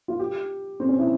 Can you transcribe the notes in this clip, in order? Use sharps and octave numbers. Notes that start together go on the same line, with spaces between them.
F4
G4
C4
C#4
E4